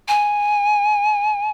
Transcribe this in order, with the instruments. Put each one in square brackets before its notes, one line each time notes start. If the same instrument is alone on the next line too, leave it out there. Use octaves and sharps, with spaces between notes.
[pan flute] G#5